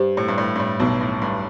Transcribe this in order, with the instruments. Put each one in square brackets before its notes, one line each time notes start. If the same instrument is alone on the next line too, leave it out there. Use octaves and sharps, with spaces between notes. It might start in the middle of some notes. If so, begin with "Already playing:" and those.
Already playing: [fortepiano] G2 [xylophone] G4 C5
[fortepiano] A2
G2
A2
G2
A2
B1 B2
A2
G2